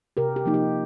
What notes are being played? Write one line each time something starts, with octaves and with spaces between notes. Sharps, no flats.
C3 G4 A#4
G4
F3 A#3 D#4
G4